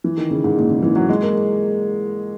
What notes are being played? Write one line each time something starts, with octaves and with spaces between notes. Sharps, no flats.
E3
D#3
C#3
G#2
A#2
C#3
E3
F#3
G#3
A#3